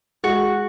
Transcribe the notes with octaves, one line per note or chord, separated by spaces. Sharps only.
G#3 F#4